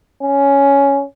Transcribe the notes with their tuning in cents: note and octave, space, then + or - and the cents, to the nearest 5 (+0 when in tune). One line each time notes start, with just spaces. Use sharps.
C#4 +10